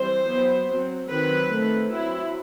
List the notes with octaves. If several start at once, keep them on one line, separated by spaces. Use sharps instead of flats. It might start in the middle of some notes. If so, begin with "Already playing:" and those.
Already playing: E3 G3 C4 C5
F#3 B3
F#3 C4
D#3 F#3 C4 B4
D#3 A3 C4
F#3 C4 E4